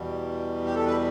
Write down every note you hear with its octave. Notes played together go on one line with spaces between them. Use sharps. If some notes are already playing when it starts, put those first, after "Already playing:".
Already playing: E2 B2 G3
G4
A4
B4